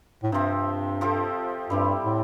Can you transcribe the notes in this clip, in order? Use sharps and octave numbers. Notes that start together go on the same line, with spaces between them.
A2
G2 C3 F3 C4
F3 C4 F4 A4
G2 G3 C4 E4 G4
A2